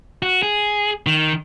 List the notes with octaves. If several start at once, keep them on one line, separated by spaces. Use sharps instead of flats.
F#4
G#4
D#3